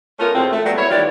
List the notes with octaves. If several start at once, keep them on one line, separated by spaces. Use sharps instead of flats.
A3 B3 C#4 F4 A#4
E2 B2 C4
A3
F#3 G3 B3
E4 C#5
D#3 E3 F4 G4 D5